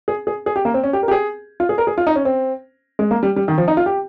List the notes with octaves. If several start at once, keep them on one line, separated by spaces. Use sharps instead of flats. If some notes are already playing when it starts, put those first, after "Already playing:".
G#4
G#4
G#4
G4
A#3
C4
C#4
G4
A#4
G4
G#4
F4
G#4
A#4
G#4
F4
D#4
C#4
C4
G#3
A#3
G3
G3
D#3
F3
D#4
F4
G4